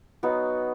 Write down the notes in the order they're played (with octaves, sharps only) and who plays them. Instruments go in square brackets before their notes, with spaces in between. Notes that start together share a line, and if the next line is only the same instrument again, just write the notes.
[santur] F#3 B3 D#4 F#4